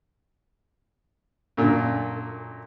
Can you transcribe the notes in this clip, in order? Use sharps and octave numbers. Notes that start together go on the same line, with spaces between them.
F#2 A#2 D3